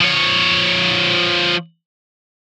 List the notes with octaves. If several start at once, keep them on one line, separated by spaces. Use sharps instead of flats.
F3 C#5